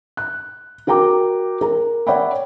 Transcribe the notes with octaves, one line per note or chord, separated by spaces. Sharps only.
F#6
F#4 A#4 G5 A#5 D6
A#4 A#5
C#5 D5 E5 F#5 G5 B5